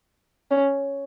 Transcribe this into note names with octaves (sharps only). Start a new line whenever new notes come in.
C#4